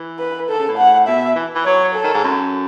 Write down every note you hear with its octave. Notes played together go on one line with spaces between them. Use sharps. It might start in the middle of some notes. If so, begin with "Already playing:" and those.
Already playing: E3
B4
D#3 A4
C#3
A2
F#5
B2 E5
E3
E3
F#3 C#5
A4
D#3
G#2
F#2